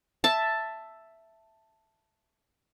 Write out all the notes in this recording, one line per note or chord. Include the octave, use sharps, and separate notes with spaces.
E5 A5